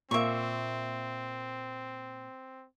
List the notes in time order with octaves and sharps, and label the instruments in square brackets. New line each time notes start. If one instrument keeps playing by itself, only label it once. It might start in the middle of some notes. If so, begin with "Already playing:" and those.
[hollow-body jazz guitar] A#2 A#3 [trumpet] C4 [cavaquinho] E5 C#6